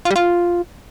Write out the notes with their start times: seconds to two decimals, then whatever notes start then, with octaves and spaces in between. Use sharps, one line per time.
0.05 F4
0.10 G3
0.16 F4